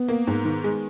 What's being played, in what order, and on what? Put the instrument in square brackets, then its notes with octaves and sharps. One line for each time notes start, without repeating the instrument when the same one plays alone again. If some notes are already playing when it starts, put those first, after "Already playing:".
Already playing: [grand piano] B3
[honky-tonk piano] A#3
G#2
D#3
G#3